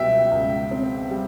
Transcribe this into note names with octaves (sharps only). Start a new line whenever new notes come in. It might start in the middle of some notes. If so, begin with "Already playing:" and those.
Already playing: C#2 B2 G3 E5 G5
C#2
C4
G3